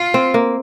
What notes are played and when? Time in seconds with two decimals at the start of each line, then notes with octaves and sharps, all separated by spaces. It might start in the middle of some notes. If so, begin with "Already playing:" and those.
Already playing: F4
0.14 C4
0.34 A#3